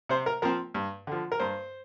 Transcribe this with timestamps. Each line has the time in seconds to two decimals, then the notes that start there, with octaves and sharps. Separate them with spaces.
0.09 C3 C5
0.26 A#4
0.42 F3 C4 A#4
0.74 G2
1.07 D3 F3
1.32 A#4
1.40 G2 C5